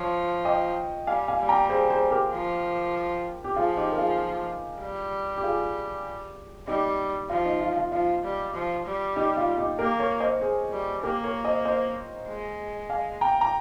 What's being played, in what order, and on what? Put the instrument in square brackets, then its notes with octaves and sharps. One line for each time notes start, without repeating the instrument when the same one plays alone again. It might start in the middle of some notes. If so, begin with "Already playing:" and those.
Already playing: [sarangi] F3 [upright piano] C#5
[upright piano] D#5 G5
[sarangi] G3 [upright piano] F5 G#5
[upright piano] F5 G#5
[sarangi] G3
[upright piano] G5 A#5
G#4 C5
G#4 C5
G4 A#4
[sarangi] F3
[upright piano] G4
[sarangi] F3 [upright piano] F4 G#4
[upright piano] D#4 G4
A#4
F4 G#4
[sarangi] G3
[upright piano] G4
F4 G#4
[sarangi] G3 [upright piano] D#4 G4
[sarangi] F3 [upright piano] F4
[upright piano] D#4
F4
F4
[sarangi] F3 [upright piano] F4
[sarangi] G3
F3
G3
[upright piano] D#4 G4
F4
D#4 G4
[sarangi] A#3 [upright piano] G4 A#4
[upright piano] A#4 C#5
C5 D#5
G#4 C5
[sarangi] G3
[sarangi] A#3 [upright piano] G4 A#4
[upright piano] A#4 C#5
C5 D#5
C5 D#5
[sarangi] G#3
[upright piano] F5 G#5
G5 A#5
A#5